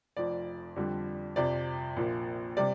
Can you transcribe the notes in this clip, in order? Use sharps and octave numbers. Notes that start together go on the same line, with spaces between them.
F1 F2 F3 D5
F2 D3 G3
F2 C3 F3 D5
A#1 A#2 F3
C3 G3 D5